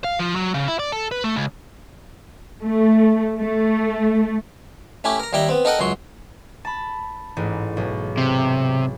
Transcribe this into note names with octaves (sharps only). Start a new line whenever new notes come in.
F5
F3
F#3
C#3
E4
D5
A4
B4
A3
C#2
A3
A3
A3 C#4 E4 G4
A#4 A#5
D#2 G3 E4 G5 A#5
B3 C4
D#4 A4 A#4 D#5 F#5 G5
C#2 F#2 F#3 C6 C#6
A5 B5
A1 G#2
B1
C3